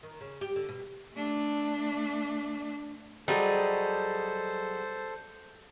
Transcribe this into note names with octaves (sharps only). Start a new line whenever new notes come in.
D#3
C#3
G4
D3
B2
A3 D4
F#3 G3 G#4 A4 C5 D#5